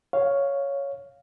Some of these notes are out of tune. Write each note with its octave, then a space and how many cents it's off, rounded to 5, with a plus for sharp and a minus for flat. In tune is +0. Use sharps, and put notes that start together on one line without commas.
C#5 +5 F5 +0